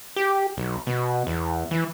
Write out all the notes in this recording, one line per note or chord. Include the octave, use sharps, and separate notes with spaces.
G4
B1
B2
E2
E3